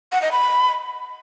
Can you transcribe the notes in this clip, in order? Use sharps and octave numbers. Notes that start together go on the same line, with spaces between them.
F#5
D#5
B5